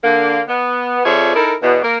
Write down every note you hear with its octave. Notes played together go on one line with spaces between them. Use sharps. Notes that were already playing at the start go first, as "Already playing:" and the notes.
D3 A#3
B3
F2 F3 G#4 C#5 D5 E5
D#4 E4 A4 A#4
E2 B2
A#3 A#4